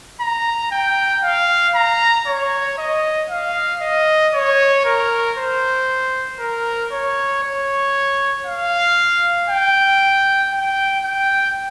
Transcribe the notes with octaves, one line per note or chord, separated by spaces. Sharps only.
A#5
G5
F5
A#5
C#5
D#5
F5
D#5
C#5
A#4
C5
A#4
C#5
C#5
F5
G5
G5
G5